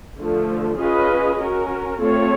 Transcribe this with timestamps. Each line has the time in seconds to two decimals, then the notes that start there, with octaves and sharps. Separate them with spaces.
0.19 D3 F3 A3
0.80 C#4 F4 G#4 B4 D#5
1.40 C#4 F#4 A#4
1.99 A3 C4 F4 A4 C#5